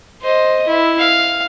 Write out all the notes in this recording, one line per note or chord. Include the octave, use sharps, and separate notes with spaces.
C5 D#5
E4
F5